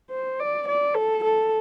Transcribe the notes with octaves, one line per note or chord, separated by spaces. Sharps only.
C5
D5
D5
A4
A4